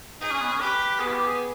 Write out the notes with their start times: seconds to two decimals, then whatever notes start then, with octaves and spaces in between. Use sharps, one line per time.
0.21 D#4 G#4
0.31 C#4
0.41 B3
0.52 C#4
0.61 G4 B4
1.00 B3 G#4
1.08 E4
1.13 G4
1.27 G#4